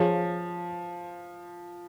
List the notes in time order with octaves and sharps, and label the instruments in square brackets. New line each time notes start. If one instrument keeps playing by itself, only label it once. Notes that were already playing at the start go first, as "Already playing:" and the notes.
Already playing: [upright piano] F3 [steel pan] F4 G#4 C#5